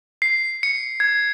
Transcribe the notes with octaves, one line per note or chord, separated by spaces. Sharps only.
C7
C#7
G#6